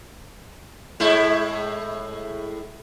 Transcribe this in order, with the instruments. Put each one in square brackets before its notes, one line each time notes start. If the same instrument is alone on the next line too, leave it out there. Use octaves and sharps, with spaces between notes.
[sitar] A2 G#3 E4